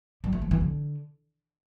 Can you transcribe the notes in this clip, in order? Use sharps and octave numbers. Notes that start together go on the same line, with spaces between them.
G3
A3
F3
E3
D3